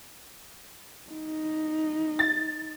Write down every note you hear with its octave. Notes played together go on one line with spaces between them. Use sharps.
D#4
A6